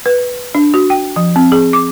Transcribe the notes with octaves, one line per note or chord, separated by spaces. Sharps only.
B4
D4
F#4
G5
F3
C4
G#4
D6